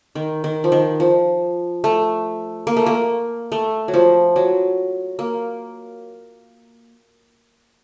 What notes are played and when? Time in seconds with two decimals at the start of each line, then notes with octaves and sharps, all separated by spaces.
0.15 D#3
0.44 D#3
0.64 F3
0.72 D#3
1.00 F3
1.84 A3
2.67 A#3
2.77 A3
2.86 A#3
3.52 A3
3.88 F#3
3.94 F3
4.36 F#3
5.19 A#3